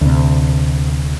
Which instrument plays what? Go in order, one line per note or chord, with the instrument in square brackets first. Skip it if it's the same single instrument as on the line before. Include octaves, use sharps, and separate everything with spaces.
[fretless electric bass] D2 C3